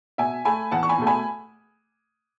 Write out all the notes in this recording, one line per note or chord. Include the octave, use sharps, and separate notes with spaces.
B2 E5 G#5
A3 G#5 B5
E2 F#5 A5
C#6
G#5 B5
B2 A3
G#5 B5